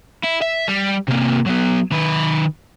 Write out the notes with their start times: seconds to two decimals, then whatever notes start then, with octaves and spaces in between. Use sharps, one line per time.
0.24 E4
0.42 E5
0.68 G3
1.08 C3 A#3
1.46 F#3 B3
1.92 D#3 B4